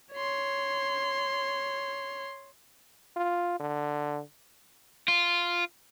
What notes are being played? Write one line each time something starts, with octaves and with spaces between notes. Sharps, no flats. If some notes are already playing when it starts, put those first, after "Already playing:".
C#5 C6
F4
D3
F4